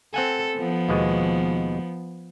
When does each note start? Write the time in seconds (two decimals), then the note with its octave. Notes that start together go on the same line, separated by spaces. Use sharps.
0.14 C4 A4 F#5 G#5
0.57 F3 B3
0.89 D#2 B2 G#3